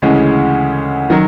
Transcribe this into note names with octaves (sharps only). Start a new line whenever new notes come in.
D2 C#3 E3 G#3 C#4
D#3 F#3